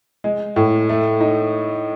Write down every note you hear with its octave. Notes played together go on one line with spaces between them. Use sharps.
G#3
A2
A3
D#4